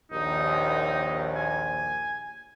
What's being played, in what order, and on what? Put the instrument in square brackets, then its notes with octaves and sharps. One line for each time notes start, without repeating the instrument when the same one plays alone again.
[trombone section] A#1 D#2 [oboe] D#4
[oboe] G#5